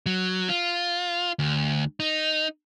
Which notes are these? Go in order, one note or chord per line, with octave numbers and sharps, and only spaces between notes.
F#3
F4
D2
D#4